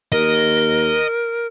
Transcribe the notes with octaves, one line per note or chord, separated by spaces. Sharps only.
D#2 A#4 D#5